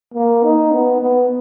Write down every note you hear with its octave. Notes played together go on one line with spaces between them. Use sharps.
A#3
D#4
B3
B3